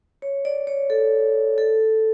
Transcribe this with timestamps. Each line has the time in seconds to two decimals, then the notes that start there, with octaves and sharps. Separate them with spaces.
0.22 C#5
0.45 D5
0.67 C#5
0.90 A4
1.58 A4